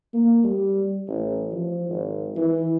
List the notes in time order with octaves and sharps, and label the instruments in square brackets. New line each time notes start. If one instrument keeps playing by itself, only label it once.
[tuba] A#3
G3
A1
F3
G#1
E3